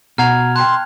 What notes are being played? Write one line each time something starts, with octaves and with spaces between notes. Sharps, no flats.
B2 F#5 A#5 F6 G#6 F7
G5 A5 C6 F6 F#6